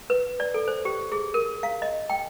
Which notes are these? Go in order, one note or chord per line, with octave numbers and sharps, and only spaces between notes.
B4
D5
A4
C5
G4
G#4
A#4
F5
D#5
G5